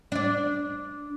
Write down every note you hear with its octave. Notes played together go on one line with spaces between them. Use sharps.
D4 D5